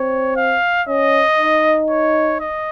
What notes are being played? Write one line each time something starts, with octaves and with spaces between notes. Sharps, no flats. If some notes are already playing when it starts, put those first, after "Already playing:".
Already playing: C4 C#5
F5
C#4 D#5
D#4
C#5
D#5